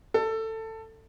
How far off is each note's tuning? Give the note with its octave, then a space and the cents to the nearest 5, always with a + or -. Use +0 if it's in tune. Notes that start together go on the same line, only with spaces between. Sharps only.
A4 +15